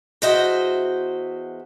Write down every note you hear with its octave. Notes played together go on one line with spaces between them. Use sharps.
E2 F#4 C5 D#5 E5 G5